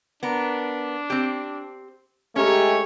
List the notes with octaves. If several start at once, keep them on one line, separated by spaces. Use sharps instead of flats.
B3 D4 A#4
C4 G4
G#3 A3 C#4 G4 C#5 A#5